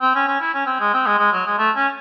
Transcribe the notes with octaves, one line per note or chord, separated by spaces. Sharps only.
C4
C#4
C#4
E4
C#4
C4
G#3
C4
G#3
G#3
F#3
G#3
A3
C#4